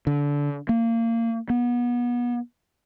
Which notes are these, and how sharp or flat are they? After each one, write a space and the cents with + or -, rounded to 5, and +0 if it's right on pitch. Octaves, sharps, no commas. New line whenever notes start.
D3 -25
A#3 -25
B3 -30